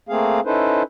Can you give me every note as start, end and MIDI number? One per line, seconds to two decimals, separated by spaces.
0.09 0.40 57
0.09 0.40 58
0.09 0.40 60
0.09 0.40 68
0.09 0.40 77
0.45 0.83 61
0.45 0.83 63
0.45 0.83 64
0.45 0.83 69
0.45 0.83 71
0.45 0.83 72